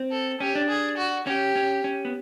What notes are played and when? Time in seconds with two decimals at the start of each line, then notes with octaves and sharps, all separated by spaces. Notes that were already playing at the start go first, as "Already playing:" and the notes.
Already playing: C4
0.11 A4
0.40 C#4 G4
0.55 D4
0.69 G#4
0.97 F#4
1.27 C#4 G4
1.56 C#4
1.84 C#4
2.05 B3